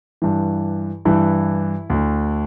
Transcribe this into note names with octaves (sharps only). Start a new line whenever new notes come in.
G2 E3
G2 E3 E4
D2 D3